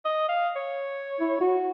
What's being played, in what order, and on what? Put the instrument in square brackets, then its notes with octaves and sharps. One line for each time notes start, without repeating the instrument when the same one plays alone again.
[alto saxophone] D#5
F5
C#5
[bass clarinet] E4
F#4